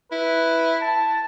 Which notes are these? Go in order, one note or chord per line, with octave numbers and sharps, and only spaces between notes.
E4 B4
A5